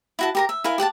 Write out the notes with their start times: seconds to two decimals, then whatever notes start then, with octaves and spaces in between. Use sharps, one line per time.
0.19 E4 F#4 A5
0.35 G4 A#4 A#5
0.49 E5
0.64 E4 A#4 F5 G#5
0.78 G4 F#5 G5 A5